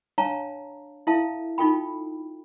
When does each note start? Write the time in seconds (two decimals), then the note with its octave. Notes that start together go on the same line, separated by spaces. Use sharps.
0.18 D4 C#5 F5 A5 A#5
1.07 E4 A4 E5 F5 A5
1.58 D#4 F4 A4 G5 B5